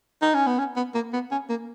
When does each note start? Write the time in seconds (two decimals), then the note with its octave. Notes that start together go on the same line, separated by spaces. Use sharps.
0.22 D#4
0.34 C#4
0.47 B3
0.59 C#4
0.76 B3
0.94 A#3
1.13 B3
1.31 C#4
1.49 A#3